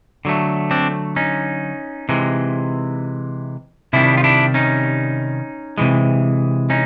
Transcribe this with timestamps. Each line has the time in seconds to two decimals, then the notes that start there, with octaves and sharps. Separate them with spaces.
0.25 D3 F#3 A3
0.71 C4 D4
1.16 C#4 D#4
2.09 C3 E3 G#3
3.93 C3 D#3 G3 D4 E4
4.17 F4
4.24 D4 E4
4.54 C#4 D#4
5.78 C3 E3 G#3
6.70 C#4 D#4